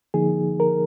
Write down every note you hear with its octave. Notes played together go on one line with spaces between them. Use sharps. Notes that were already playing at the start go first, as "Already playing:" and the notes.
D3 F3 A#3 D#4 G#4
A#4